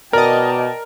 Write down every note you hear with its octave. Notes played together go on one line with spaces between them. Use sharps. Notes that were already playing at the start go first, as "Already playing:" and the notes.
B2 A#4 D5 D#5 G5 A5